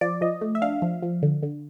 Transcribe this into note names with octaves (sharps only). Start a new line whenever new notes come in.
F3 D5
F3 D#5
A3
E5
D4 F5
F3
F3
D3
D3